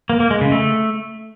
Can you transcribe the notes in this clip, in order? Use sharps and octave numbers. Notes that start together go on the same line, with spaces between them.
A#3
A#3
G#3
C#3
A3